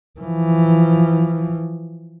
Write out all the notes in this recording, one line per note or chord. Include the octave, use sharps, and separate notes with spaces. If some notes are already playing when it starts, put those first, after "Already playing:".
E3 F3